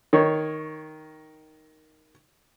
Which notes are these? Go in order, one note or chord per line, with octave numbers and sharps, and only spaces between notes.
D#3 C#5